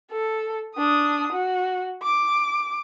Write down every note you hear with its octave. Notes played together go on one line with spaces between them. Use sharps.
A4
D4 D#6
F#4
D6